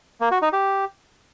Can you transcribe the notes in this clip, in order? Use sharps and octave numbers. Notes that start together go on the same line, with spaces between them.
A#3
F#4
D#4
G4